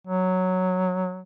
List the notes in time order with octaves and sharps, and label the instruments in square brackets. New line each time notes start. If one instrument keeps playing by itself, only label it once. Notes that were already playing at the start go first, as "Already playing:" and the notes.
[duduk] F#3